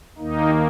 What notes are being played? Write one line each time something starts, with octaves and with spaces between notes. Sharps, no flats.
D#2 D#3 A#3 D#4